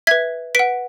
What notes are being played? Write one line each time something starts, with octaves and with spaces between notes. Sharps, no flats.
B4 E5 G#6 B6
B4 F#5 B6 D7